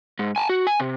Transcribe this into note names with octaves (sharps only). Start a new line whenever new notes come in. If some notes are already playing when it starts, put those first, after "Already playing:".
G#2
G#5 A5
F#4
G#5
C3